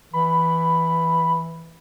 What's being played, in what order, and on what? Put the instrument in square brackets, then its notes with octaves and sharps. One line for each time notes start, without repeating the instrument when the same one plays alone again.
[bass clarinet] E3 [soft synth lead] B5